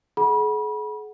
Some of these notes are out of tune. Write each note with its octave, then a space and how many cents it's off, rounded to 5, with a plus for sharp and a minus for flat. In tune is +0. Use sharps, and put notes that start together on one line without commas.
G#4 +40 F#5 +0 B5 -35